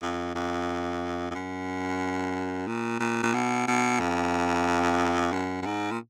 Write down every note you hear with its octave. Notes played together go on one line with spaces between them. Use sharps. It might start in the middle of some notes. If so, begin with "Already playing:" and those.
F2
F2
F2
F#2
A#2
A#2
A#2
B2
B2
F2
F#2
F#2
G#2
A#2